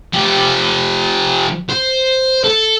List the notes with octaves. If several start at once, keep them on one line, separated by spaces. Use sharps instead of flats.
F3 G4
C5
A4